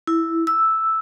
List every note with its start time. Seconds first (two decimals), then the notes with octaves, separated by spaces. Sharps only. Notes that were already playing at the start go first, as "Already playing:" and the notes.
0.07 E4
0.47 E6